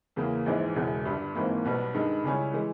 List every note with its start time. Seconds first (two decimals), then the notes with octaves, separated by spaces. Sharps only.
0.16 E2 C#3 E3 A#3
0.46 A#1 G#2 E3 G#3
0.76 E1 E2 C#3 G#3
1.05 G1 G2 G3
1.35 G#1 G#2 E3 A#3
1.64 B1 B2 G3 B3
1.94 G2 D#3 G#3 D#4
2.24 C#2 C#3 G3 C#4 E4
2.54 E3 G#3